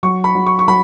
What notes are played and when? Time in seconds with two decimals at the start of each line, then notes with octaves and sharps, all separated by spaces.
0.03 F#3 C#6
0.24 B5
0.35 F#3
0.46 C#6
0.59 C#6
0.68 F#3 B5